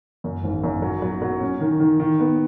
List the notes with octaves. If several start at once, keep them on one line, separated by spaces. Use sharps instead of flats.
F#2
G#1
F#2
F#3
F#3
F#3
C#4
D#3
D#3
D#3
B3